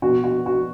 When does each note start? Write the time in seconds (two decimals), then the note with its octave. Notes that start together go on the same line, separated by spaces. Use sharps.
0.02 B2 F#4
0.24 F#4
0.46 F#4